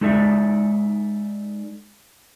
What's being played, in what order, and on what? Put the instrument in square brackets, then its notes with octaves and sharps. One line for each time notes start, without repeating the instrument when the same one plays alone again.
[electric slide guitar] G#3 D#4 A4 D5 E5